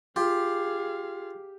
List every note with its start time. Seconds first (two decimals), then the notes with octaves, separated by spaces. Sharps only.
0.16 F4 G4 G#4 F5